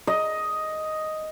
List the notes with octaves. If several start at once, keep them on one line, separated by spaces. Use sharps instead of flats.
D#5